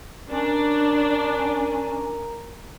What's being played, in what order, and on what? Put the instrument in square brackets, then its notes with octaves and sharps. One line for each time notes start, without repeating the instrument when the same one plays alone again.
[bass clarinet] C#4 [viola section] D4 [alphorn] A#4